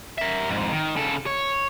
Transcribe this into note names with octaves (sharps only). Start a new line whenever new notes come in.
A#4 E5
F2 G#2
D#3
C#3 A4
C#5